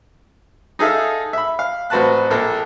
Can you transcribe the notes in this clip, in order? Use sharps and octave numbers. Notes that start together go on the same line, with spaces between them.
D#4 G#4 A4 E5 F5
E5 B5
F5
A1 C4 F#4 B4 A5 F#6
A#1 A#3 A4